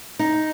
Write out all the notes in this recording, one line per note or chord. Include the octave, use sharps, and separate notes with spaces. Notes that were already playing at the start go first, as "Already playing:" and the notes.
D#4